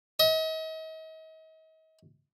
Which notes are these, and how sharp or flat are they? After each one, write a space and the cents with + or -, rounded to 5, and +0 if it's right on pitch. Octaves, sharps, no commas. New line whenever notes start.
D#5 +40